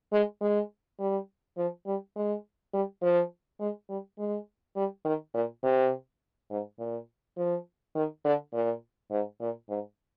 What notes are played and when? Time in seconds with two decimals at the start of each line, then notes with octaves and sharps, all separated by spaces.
0.12 G#3
0.41 G#3
0.99 G3
1.58 F3
1.86 G3
2.16 G#3
2.73 G3
3.02 F3
3.60 G#3
3.89 G3
4.18 G#3
4.76 G3
5.05 D#3
5.34 A#2
5.63 C3
6.50 G#2
6.79 A#2
7.37 F3
7.95 D#3
8.24 D3
8.53 A#2
9.11 G#2
9.40 A#2
9.69 G#2